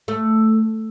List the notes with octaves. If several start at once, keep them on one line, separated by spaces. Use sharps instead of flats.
A3